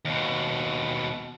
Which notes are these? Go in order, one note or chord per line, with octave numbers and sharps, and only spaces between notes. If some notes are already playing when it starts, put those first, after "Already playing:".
D#2 B2